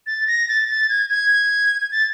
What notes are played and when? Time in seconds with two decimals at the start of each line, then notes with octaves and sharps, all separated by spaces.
0.07 A6
0.27 A#6
0.49 A6
0.69 A6
0.89 G#6
1.10 G#6
1.82 G#6
1.92 A6